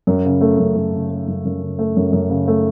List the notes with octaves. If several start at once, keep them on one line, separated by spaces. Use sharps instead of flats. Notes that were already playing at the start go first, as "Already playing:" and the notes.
F#2
C#3
A3
F#2
F#2
C#3
A3
F#2
F#2
C#3
A3
F#2
F#2
C#3
A3